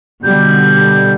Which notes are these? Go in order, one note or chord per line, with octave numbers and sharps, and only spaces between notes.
B2 D3 G3 G6